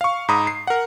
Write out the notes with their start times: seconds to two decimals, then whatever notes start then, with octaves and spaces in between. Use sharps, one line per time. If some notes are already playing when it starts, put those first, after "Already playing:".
0.01 F5 C#6
0.28 G#2 A#5 B5 D#6
0.47 C7
0.67 A#4 F#5